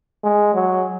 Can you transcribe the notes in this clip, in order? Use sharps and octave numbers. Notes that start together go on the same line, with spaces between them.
G#3
F#3